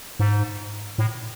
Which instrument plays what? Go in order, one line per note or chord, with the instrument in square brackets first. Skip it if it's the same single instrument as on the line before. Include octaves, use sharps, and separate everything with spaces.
[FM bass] G#2
A2